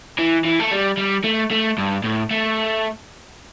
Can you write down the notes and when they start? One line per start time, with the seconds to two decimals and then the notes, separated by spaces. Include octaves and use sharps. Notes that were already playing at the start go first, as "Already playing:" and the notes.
0.18 E3
0.45 E3
0.60 A3
0.71 G3
0.97 G3
1.24 A3
1.51 A3
1.78 G2
2.04 A2
2.31 A3